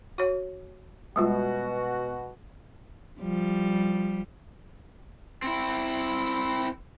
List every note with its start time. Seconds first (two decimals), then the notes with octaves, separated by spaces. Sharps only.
0.18 F#4 C#5
1.16 B2 G3 G#3 F4 F#4
3.21 F3 G3
5.42 C4 E4